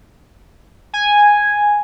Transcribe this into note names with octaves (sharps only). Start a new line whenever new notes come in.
G#5